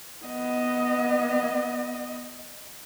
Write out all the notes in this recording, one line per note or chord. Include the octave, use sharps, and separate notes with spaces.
B3 D#5